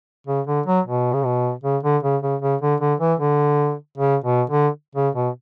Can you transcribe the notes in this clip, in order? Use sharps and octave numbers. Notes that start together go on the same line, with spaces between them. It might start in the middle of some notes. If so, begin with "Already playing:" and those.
C#3
D3
F#3
B2
C#3
B2
C#3
D3
C#3
C#3
C#3
D3
D3
E3
D3
C#3
B2
D3
C#3
B2